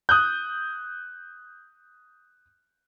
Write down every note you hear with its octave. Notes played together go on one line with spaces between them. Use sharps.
D#6 F#6 G6